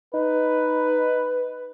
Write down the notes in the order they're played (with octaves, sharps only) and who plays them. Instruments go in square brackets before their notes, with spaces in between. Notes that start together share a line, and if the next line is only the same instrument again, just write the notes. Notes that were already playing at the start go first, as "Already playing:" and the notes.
[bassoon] D#4 [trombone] B4